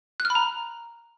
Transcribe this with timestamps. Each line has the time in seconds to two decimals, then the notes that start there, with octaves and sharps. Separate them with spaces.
0.20 F#6
0.25 F6
0.30 B5
0.35 A#5